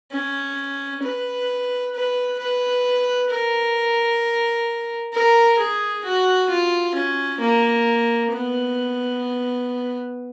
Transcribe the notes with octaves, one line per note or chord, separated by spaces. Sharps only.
C#4
B4
B4
B4
A#4
A#4
G#4
F#4
F4
C#4
A#3
B3